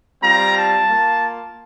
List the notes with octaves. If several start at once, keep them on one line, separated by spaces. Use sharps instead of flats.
G3 C4 F4 A#5
A5
A#3 F4